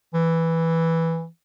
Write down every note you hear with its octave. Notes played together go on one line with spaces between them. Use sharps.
E3